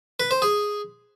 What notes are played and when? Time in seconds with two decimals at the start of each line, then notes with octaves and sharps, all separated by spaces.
0.20 B4
0.31 C5
0.42 G#4